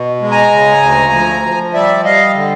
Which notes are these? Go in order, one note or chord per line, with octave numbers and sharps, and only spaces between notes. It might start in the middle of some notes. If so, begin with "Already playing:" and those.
Already playing: B2
G#3
G#5 A#5
C#3
D2
F3
F3
G3 D5 E5
G3 D#5 F5
D3